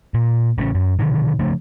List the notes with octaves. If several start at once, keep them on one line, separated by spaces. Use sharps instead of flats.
A#2
A1 C#3 G#3 C#4
F#2
B2 D3 D#3
C#3 F3 A3 D4